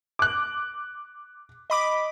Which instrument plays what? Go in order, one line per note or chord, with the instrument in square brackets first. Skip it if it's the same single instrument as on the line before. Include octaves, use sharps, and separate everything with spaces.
[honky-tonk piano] D6 F#6
[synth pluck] D#5 B5 D6